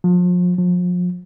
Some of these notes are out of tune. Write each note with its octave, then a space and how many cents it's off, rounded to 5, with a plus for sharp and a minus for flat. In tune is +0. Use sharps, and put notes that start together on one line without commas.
F3 +35
F3 +35